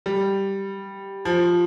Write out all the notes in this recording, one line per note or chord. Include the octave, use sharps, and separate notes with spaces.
G3
F3